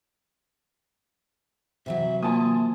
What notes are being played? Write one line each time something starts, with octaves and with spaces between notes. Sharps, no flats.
C3 E3 F#3 E5
A#3 F4 G#5 A5 D#6